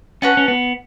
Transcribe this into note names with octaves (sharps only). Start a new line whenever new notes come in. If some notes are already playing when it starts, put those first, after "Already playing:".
C#4 F#4 B4 F#5 A5
C#4
B3